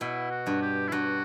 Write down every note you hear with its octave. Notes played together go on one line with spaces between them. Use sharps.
B2 E4
F#4
G2
G4
E4
G2 F#4